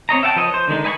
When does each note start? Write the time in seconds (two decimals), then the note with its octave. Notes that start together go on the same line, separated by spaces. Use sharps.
0.09 C4 C#5 D#5 A#5
0.23 E5 F#5 G5 A5
0.36 F3 B4 C#5 D#5
0.54 C5
0.67 D3 D#3 G#3 D#4
0.84 B4 D#5 G#5 B5 C#6